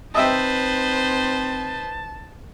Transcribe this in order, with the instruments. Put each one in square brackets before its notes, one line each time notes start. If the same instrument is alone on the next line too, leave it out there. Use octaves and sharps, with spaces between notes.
[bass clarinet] C4 [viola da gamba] D#4 B4 C5 [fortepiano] D#5 E5 G5 [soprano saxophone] A5